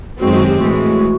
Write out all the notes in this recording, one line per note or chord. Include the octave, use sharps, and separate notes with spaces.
F#2 D#3 G#3 C4 F#4
F#4
G4
A2 E3 G#3 F#4